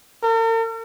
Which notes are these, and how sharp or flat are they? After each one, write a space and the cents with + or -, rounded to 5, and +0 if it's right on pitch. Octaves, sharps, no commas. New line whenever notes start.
A#4 -45